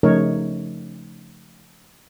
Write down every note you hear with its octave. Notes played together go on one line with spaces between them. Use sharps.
C#3 F3 A3 D#4 A#4 C#5